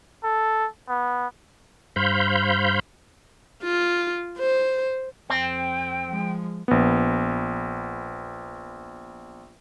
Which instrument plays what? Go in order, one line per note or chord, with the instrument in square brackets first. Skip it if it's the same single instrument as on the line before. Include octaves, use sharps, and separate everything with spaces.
[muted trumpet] A4
B3
[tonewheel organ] G2 C5 F5 B5 G6
[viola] F4
C5
[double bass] F2 [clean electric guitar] C4 [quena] G5
[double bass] F3 G#3
[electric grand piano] A#1 B3